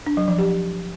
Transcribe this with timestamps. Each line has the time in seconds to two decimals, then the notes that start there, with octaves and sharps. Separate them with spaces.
0.06 D4
0.17 F#3
0.28 F3
0.39 G4